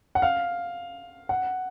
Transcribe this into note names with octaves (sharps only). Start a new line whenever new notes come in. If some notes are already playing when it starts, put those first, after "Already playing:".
F#5
F5
F#5